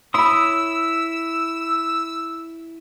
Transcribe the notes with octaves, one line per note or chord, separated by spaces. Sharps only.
E4 C#5 B5 C6 D#6 E6